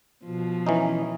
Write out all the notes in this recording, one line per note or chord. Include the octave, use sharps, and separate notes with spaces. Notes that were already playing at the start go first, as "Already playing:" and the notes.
B2 F3
E3 C#4 D#4